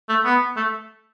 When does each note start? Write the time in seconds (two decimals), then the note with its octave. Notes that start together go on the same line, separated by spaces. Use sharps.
0.09 A3
0.25 B3
0.57 A3